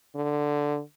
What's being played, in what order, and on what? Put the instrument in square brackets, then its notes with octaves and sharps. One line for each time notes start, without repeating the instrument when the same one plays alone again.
[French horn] D3